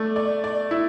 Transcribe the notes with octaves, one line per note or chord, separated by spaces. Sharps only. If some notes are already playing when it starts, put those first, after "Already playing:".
Already playing: A3 D5
D5
D5
E4